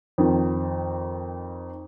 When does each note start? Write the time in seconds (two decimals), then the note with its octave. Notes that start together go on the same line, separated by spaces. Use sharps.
0.18 F2 D#3